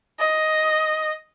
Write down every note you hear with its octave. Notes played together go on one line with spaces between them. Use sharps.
D#5